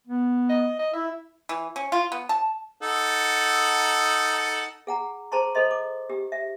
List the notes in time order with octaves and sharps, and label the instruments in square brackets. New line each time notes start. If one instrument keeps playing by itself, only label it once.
[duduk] B3
[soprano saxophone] D#5
D#5
[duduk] E4 [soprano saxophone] E5
[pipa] E3
C#4
F4
B3
A5
[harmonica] D#4 A4 F#5
[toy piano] G#4 F#5 A#5
G#4 C5 A5 A#5 C6 C#6
A4 C5 D#5 C6
D6
G4
E5